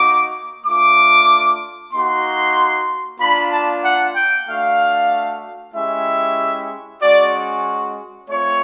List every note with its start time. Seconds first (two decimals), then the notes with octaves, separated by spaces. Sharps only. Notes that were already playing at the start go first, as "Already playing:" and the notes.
Already playing: A#3 D#4 F#4 D6
0.66 A3 D4 F4 D6
1.93 A#3 D#4 F#4 C6
3.20 A#3 D4 F4 B5
3.52 A5
3.84 F#5
4.16 G5
4.47 A3 D4 F#4 F5
5.75 G#3 C#4 E4 G4 E5
7.02 G#3 C#4 F#4 D5
8.29 A3 C4 F4 C#5